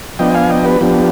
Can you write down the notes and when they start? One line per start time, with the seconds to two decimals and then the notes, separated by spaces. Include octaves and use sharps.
0.19 F3 B3 D4 D#5 G5
0.34 F5 G#5
0.50 D#5 G5
0.65 G4 B4
0.81 F3 B3 D4 G4